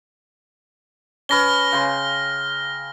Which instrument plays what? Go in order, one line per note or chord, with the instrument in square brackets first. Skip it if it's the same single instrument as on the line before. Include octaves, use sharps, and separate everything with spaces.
[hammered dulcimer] C#4 B4 [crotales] F6 A#6 G7
[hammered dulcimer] C#3 G5 C6